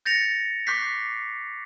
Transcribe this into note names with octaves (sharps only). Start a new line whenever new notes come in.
G6 A6 A#6 C#7 F7
C#6 D6 F#6 G6 B6 C7